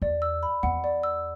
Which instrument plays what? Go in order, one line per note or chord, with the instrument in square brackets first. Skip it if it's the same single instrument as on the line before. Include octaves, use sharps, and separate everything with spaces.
[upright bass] E2 [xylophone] D5
[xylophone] E6
B5
[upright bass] E2 [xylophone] F#5
[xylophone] D5
E6